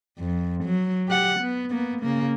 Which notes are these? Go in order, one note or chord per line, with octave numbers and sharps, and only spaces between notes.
F2
F#3
G4 F#5
B3
A#3 B3
C#3 A#3